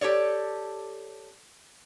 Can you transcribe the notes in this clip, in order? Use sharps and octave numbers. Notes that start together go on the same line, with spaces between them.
G4 A4 C#5 D5